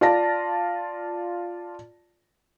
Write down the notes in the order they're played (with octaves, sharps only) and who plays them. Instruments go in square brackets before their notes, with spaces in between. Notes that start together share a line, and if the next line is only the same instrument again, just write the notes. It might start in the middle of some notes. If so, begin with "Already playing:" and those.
[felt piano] F4 D5 A5 A#6